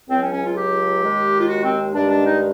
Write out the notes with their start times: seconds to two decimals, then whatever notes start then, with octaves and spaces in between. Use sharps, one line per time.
0.09 C#2 C#3 F#3 C4
0.21 C#4
0.33 C#4
0.45 F4
0.56 G4
1.02 D#2 D#3 G#3
1.39 F4
1.48 F#4
1.63 C4
1.94 G2 D#3 G#3 D4
2.10 D4
2.25 D#4